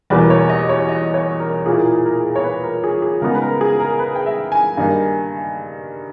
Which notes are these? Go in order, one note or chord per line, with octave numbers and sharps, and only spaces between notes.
E2 B2 G3 A#3 B4
C#5
D#5
C#5
D#5
C#5
A#4
A#2 A#3 E4 G#4
A#4
C#5
B4
A#4
G#4
G#4
C#3 G#3 B3 D#4 A#4
B4
A#4
G#4
A#4
B4
G5
E5
G#5
G2 D#3 A#3 D#4